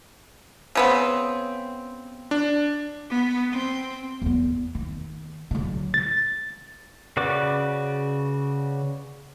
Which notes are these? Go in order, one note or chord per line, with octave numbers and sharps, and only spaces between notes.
C#3 B3 C4
D4
B3
C4
E2 B3
D#3
D3 F#3
A6
C#3 F#4 B4 D5 D6